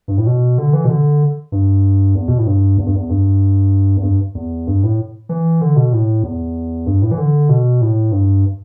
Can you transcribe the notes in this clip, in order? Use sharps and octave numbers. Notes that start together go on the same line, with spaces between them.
G2
A2
B2
D3
E3
B2
D3
G2
E2
B2
A2
G2
E2
G2
E2
G2
E2
G2
E2
G2
A2
E3
D3
B2
A2
E2
G2
A2
E3
D3
B2
A2
G2